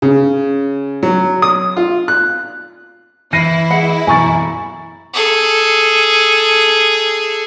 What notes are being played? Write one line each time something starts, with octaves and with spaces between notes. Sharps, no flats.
C#3
F#3
D#6
F4
F#6
E3 E4 A#6 C7 D#7
G#4 D#5 E5 F#5
F#2 B2 E3 G#5 A#5 C#6 A6
G#4 A4